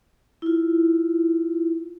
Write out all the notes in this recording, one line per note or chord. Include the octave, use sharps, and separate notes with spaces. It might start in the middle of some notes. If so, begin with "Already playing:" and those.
E4 F4